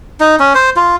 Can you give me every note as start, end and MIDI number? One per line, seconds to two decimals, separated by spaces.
0.20 0.36 63
0.40 0.53 61
0.55 0.70 72
0.76 0.96 65